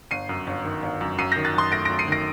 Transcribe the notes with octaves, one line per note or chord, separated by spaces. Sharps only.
G1 C7 D#7
F#2
G1
D#3
G1
F#2
F#2 C7 D#7
G6 A#6
D#3
F#6 A6
F#2 C6 D#6
A3 A#6 D7
A#6 D7
F#2
C7 D#7
D#3 A#6 D7